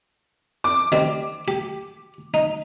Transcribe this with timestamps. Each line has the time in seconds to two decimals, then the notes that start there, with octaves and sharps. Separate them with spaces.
0.64 D6
0.92 D#3 G3 C4
1.48 G4
2.34 D#4